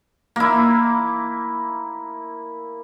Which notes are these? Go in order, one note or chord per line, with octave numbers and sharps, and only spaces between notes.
A#3 E4